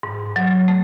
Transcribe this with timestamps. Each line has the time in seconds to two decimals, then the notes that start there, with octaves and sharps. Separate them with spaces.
0.03 G#2
0.36 F#3
0.68 A3